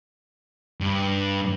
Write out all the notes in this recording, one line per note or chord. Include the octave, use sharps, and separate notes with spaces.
G2